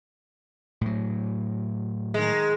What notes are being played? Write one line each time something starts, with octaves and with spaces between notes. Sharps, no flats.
A2 F#3
D#3 G#3